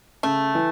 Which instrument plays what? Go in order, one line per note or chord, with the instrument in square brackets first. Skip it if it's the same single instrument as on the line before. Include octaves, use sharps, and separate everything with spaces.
[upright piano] C#3 [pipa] A3
[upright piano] E3